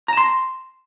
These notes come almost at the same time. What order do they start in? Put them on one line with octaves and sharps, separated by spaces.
A#5 A5 C6